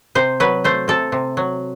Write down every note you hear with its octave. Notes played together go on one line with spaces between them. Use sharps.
C3 C5
F#3 B4
A3 C5
C3 A4
C3
F#3